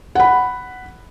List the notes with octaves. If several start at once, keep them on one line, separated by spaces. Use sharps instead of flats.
F#5 B5